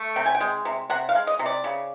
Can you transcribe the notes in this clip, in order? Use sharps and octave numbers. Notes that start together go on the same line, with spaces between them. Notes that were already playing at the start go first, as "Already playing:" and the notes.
Already playing: A3
C3 G5
G#5
G5
G#3
C3
C3 F#5
F5
G#3
D#5
C3
D5
C#3